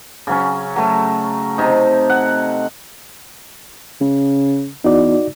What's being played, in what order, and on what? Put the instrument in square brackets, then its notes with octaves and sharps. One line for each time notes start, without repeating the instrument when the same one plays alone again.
[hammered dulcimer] C#3 F#3 C#4
F#3 A3
C3 D#4
F#5
[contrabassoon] C#3
[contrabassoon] E2 [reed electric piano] D#4 F#4 D5